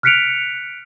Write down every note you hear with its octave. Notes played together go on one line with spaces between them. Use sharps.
F6 F#6 B6 C#7 D7 F7